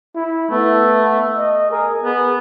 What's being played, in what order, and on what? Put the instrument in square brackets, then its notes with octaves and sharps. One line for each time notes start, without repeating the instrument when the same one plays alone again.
[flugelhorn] E4
[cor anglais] A3 [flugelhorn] B3
[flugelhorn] D#5
[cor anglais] G#4 [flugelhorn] A#4
[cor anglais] B3 [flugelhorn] G#4